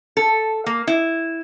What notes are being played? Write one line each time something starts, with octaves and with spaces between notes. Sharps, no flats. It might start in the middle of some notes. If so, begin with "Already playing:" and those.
A4
A#3
E4